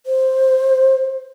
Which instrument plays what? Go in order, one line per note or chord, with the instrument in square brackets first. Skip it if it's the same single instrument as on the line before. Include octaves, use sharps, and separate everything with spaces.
[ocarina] C5